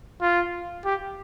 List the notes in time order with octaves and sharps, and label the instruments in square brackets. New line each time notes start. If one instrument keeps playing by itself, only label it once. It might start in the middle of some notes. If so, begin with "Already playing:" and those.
[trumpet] F4
G4